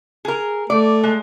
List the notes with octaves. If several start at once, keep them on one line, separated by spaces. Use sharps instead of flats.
G#4 A#4
A3 D5
G#3